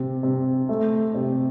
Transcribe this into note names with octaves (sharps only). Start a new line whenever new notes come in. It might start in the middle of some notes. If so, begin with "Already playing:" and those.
Already playing: C3
C3
A3
C3